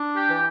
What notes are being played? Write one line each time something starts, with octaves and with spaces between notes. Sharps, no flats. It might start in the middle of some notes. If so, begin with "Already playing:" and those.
Already playing: D4
G4
E3